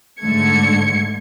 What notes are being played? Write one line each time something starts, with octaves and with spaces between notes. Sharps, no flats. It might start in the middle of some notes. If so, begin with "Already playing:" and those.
G#2 D3 A3 G#6 C#7